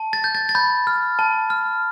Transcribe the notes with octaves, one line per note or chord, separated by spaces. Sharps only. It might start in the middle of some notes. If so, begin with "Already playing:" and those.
Already playing: A5
A6
G6
A6
A6
B5 G6
F6
A5
F6